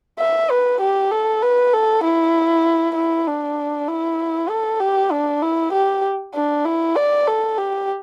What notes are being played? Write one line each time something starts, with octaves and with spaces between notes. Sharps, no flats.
E5
B4
G4
A4
B4
A4
E4
E4
D4
E4
A4
G4
D4
E4
G4
D4
E4
D5
A4
G4